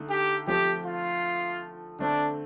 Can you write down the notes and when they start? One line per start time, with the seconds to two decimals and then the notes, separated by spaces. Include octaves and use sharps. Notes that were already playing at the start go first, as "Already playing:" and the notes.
Already playing: D3 A3 D#4
0.10 G4
0.47 F3 A3 C4 G4
0.86 F4
1.99 D3 A3 C4 D4